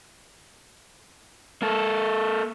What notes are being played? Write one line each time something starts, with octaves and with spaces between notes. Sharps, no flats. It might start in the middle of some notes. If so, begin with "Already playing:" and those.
A#3 A4